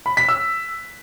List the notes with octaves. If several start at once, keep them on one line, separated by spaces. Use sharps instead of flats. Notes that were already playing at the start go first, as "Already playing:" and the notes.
B5
B6
E6